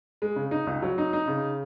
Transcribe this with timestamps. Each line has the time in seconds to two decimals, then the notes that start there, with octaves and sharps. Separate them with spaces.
0.22 G#3
0.36 C#3
0.51 D#4
0.67 C#2
0.82 F#3
0.98 D#4
1.13 D#4
1.27 C#3